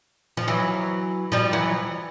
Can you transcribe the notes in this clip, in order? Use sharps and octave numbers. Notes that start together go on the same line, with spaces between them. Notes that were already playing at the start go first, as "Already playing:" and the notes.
F3
E3 F#3
F3 G3
E3 F#3